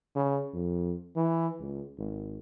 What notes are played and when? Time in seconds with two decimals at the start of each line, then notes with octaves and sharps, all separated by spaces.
0.15 C#3
0.54 F2
1.16 E3
1.60 C#2
1.98 G#1